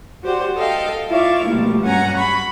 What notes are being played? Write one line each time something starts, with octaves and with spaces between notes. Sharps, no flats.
F#4 G4 C5 D5 F#5
A4 D#5 F5 G5
E4 F4 D5 E5 F5 C#6
B2 F3 G3 A3 A#3
G2 F#3 C#4 F#5 G#5 A#5
B5 C#6